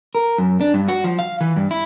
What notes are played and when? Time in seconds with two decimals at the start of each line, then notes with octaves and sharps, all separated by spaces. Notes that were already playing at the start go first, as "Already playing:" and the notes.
0.15 A#4
0.38 F#2
0.61 D4
0.74 G2
0.88 F#4
1.04 F3
1.19 F5
1.41 E3
1.56 G2
1.71 E4